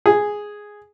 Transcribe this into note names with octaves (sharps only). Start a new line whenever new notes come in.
G#4